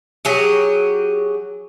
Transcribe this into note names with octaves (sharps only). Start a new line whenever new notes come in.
F#3 G4 G#4